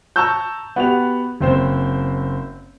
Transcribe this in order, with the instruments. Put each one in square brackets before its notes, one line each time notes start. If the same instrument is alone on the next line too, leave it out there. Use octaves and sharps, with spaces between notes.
[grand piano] A5 A#5 C#6 E6 G6
B3 F#4 G4 F7
F#1 C4 C5